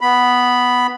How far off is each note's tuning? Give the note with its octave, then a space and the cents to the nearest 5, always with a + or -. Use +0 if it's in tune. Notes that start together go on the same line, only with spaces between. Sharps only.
B3 +0 B5 +0